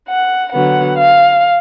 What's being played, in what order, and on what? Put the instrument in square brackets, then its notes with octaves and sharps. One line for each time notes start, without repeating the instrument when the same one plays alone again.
[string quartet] F#5
D3 F#3 B3 F#5
F5